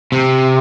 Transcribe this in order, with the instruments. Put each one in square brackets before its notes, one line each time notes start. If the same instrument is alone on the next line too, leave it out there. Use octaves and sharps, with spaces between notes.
[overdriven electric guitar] C3